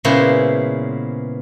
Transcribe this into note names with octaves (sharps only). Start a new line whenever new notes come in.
A#2 C#3 G#3 B3 E4 C5